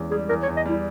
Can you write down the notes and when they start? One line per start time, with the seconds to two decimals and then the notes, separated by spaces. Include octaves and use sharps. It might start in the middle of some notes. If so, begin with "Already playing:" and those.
Already playing: E2 G#3 C#4
0.11 G3 G#4
0.29 E2 A#4
0.43 C#5
0.48 E2
0.57 D#5
0.66 G3 E4